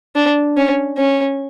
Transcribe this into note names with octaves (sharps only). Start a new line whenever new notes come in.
D4
C#4
C#4